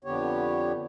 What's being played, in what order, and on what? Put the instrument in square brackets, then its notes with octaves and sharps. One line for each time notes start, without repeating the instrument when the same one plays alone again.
[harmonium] F2 D3 B3 G4 C#5